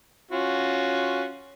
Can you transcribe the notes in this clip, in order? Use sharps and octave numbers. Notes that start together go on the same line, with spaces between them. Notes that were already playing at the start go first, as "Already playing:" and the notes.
C#4 F4 F#4